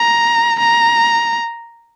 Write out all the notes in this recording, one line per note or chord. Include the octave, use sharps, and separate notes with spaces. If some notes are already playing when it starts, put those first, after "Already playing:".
Already playing: A#5
A#5